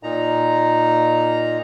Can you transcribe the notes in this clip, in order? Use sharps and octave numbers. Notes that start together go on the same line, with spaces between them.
A#2 D#4 A#5